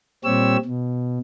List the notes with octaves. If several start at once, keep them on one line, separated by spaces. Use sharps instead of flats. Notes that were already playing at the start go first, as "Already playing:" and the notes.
A#2 G3 C4 G4 C#5 E6
B2